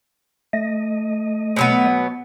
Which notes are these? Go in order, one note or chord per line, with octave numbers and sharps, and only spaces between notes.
A3 D#5
B2 F#3 B3